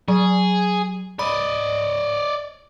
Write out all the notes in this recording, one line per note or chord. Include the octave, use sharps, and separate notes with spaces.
F#3 G#4
D5 D#5 B5